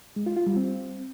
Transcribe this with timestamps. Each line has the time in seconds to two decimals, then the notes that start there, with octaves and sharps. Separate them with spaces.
0.16 G#3
0.26 F4
0.36 F4
0.47 G3
0.57 C4